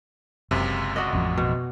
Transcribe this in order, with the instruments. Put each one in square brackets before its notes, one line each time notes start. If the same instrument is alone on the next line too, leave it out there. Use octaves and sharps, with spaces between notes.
[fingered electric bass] F#1 [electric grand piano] C#2 F#2 C3
[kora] F#4 D5 D#5
[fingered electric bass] A1 F2
[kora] B2